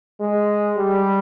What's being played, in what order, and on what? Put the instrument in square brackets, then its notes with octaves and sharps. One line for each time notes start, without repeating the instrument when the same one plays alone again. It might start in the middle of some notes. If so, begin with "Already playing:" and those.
[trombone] G#3
G3